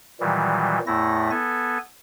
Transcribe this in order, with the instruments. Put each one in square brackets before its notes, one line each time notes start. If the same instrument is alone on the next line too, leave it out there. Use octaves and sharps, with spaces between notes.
[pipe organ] A#2 D#3 E3 F#3 G3
E2 A2 A3 E4 A#6
B3 A4 G#5